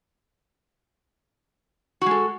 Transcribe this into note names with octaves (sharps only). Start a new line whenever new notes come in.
G#3 F#4 A4